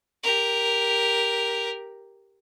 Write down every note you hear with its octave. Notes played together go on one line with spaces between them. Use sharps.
G4 A#4